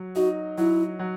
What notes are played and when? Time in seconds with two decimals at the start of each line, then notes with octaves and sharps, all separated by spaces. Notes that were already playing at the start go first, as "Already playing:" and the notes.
Already playing: F#3
0.15 D#4 F#4
0.58 F#3 E4
0.99 F#3